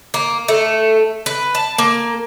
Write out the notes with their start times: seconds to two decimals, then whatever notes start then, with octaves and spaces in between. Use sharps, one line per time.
0.14 A#3
0.48 A3
1.26 B4
1.55 A5
1.78 A#3